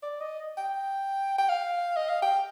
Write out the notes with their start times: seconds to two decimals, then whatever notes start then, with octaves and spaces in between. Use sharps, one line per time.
0.03 D5
0.20 D#5
0.57 G5
1.38 G5
1.49 F5
1.96 D#5
2.09 F5
2.22 G5